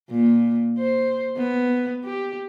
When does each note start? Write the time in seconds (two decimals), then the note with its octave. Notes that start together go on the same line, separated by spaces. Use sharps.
0.10 A#2
0.78 C5
1.38 B3
2.05 G4